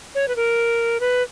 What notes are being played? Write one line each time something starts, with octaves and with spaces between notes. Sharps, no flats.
C#5
B4
A#4
B4